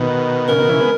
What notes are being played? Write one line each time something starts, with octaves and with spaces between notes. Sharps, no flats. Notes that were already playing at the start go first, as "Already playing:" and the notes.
Already playing: B2 D#3
C#3 A#4
B2 D#3
C#3 E3
G#3 B3